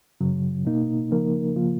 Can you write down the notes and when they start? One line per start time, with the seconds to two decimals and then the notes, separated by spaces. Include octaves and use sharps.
0.21 F#2 C#3 F#3
0.65 B2 A#3 D#4
1.11 C#3 F3 A#3 D#4 A#4
1.55 C#3 F3 A#3 F4